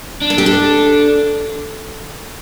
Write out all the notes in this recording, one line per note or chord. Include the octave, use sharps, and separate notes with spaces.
D4
A4
G4
A4